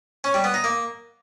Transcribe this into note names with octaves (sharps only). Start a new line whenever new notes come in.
C#4
G3
B3
D#4
A#3